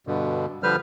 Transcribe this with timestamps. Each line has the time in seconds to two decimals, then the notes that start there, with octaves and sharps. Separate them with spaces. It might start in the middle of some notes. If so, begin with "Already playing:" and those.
0.07 G2 B2 D3
0.63 D3 F3 G3 B4 C5 F6